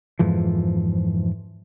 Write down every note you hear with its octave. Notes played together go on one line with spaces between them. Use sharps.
F2 G#2 E3 F3